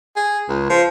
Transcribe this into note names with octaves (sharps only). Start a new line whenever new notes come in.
G#4
C#2
F3